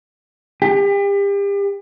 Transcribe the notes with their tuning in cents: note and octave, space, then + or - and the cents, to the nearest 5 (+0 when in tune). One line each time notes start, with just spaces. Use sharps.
G4 +35